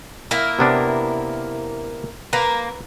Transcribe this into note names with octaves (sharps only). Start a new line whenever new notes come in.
A#3 E4 A#4
C3 B3 D4
A#3 B4 A#5